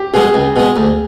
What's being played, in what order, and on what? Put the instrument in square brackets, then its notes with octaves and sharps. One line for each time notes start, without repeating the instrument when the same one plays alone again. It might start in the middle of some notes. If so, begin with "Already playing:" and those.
Already playing: [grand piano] G4
[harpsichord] B2 G#3 [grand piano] G#4
[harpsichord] C#2
B2 G#3
D2